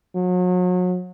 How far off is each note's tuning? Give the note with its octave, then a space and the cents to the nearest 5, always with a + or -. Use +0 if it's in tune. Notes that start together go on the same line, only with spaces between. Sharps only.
F#3 -35